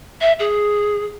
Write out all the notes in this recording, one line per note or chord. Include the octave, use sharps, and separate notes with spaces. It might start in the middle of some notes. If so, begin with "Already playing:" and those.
E5
G#4